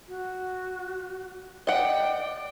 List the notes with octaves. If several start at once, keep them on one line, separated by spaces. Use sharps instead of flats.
F#4
D5 D#5 F#5 G5